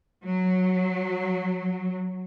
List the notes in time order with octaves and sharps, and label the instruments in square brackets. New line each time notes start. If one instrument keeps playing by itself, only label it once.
[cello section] F#3